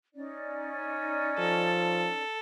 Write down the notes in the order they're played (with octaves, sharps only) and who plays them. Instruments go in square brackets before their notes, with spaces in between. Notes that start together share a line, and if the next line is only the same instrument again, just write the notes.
[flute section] C#4 D#4 D5
[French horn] F3 [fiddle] A4